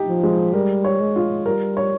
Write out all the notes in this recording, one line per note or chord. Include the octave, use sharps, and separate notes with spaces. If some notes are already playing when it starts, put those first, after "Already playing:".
Already playing: D#4 G4
F3
G#3
G3 A#4
C#5
G#3
F4
G3 A#4
C#5